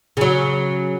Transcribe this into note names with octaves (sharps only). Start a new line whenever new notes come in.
C#3 F#3